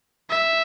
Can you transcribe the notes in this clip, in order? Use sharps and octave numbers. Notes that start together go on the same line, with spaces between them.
E5